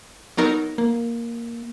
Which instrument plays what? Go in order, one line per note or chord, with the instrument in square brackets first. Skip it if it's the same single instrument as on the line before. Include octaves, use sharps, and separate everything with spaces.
[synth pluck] F#3 B3 D#4 A#4
[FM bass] A#3